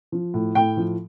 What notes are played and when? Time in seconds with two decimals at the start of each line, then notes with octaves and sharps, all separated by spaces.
0.12 F3
0.34 A2
0.55 A2 G5
0.77 F3